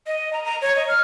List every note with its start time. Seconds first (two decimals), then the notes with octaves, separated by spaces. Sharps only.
0.07 D#5
0.33 A#5
0.45 A#5
0.62 C#5
0.76 D#5
0.88 F6